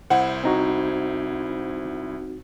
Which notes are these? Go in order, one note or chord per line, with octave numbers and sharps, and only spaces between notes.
C2 E4 C5 F#5
C4 D#4 F#4